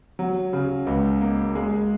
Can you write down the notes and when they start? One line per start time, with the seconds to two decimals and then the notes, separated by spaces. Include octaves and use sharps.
0.19 F#3
0.53 C#3
0.87 C#2
1.21 A#3
1.55 G#3